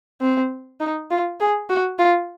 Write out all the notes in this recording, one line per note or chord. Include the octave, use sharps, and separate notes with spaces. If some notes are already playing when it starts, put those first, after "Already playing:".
C4
D#4
F4
G#4
F#4
F4